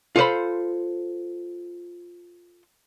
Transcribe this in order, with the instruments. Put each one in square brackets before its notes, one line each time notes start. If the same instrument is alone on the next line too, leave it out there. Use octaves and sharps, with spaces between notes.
[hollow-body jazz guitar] F4 A4 C5 B5